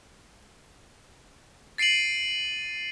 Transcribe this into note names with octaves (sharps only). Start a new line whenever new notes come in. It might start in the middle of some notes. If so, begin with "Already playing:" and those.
A6 C7 D7 D#7 F#7